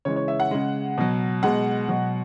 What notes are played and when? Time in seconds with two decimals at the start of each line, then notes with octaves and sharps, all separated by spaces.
0.05 C#3 E3 G#3 C#5
0.16 C#5
0.28 E5
0.40 F#5
0.51 C#3 G#3
0.98 B2 F#3
1.43 B2 G#3 F#5
1.89 B2 F#3